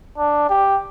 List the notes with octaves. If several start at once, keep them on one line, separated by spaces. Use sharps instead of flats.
D4
G4